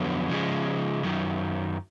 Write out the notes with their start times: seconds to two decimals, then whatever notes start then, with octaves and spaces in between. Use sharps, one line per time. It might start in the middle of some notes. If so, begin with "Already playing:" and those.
Already playing: F2 D3 F#3 B3
0.30 C#3 F3 G#3
1.03 F#2 D#3 F#3